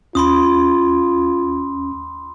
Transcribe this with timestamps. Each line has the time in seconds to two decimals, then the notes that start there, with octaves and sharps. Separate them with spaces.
0.15 D#2 C#4 F4 B5 C6 D#6